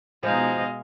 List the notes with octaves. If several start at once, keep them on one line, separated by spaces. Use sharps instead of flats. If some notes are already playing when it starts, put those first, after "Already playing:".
B2 F3 G#3 D#4 D#5 F5